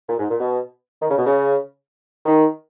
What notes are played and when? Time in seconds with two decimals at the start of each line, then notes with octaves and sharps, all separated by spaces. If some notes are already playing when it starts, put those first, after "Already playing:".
0.08 A#2
0.19 G#2
0.29 A#2
0.39 B2
1.01 D#3
1.10 C#3
1.18 B2
1.26 C#3
2.26 D#3